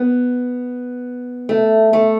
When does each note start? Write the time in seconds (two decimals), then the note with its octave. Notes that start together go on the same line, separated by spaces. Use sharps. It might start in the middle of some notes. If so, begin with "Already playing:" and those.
Already playing: B3
1.49 A3
1.93 A3